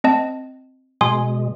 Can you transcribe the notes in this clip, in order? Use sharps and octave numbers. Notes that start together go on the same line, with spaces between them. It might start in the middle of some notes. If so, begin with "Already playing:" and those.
C4 D#5 A5
B2 G#3 G#5 C6 D#6